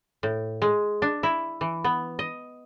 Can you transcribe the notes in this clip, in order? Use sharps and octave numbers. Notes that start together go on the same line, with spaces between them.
A2
G#3
D4
E4
E3
B3
D#5